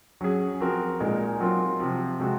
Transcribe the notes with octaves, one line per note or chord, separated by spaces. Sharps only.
F#3 C#4 G#4
F3 C4 F#4 A#4
A#2 G#3 D#4 A#4
F#3 C4 F4 A#4
C3 F3 C4
C3 F3 G#3 C4 F#4